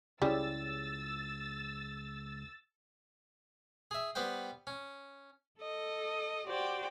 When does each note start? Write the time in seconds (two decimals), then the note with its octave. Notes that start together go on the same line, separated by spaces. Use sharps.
0.22 C#2 G3 C#4 E4 G#4 E6 A6
3.91 G#4 E5
4.15 G3 B3 B4 C5 G5
4.67 C#4
5.60 A4 D#5
6.46 F#4 G4 C5 D5 G5